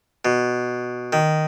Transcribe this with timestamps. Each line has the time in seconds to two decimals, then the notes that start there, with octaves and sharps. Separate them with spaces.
0.25 B2
1.13 D#3